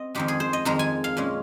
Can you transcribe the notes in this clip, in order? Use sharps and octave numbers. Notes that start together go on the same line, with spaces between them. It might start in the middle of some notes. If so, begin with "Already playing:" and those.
Already playing: C4 D#5
F2 D#3 G#3 G4
G#4
C5
D#5
F2 D#3 G#3 A#5
G#5
F5
A#2 G#3 C#4